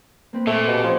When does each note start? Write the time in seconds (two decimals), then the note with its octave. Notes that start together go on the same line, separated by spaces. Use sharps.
0.33 A#3 C4 B4
0.47 A#2 A3
0.67 B2 G4
0.84 F3 C#4 G#5 C6